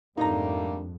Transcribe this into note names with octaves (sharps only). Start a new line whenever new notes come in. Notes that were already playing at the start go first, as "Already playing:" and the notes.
F2 G#2 G3 A3 A#3 D4 D#4 A#5